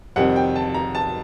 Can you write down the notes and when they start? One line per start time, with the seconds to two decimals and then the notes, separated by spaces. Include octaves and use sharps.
0.16 F2 C3 D#3 G3 C4 F#5
0.36 G5
0.56 A5
0.74 A#5
0.95 A5